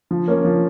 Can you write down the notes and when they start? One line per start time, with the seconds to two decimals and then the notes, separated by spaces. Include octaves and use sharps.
0.11 F3
0.28 A#3 C#4
0.45 F3